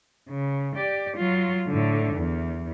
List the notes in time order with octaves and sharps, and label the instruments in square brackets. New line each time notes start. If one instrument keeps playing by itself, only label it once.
[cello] C#3
G4 D5
F#3 F4
A2 D3
E2